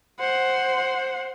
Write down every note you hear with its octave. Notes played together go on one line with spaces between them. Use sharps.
C5 F#5